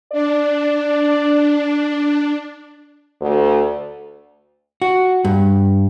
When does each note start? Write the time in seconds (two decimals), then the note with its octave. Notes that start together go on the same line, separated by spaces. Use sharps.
0.12 D4 D5
3.21 D2
4.82 F#4
5.25 G2